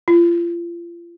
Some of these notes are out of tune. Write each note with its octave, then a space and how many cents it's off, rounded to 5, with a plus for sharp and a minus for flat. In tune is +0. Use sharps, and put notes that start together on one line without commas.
F4 -35